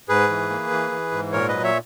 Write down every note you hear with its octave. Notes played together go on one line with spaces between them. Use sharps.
G#2 G#4 B4
E3
A#3
E3
E3
G#2
A#2 A#4 C#5
F#3 B4 D#5
C#5 E5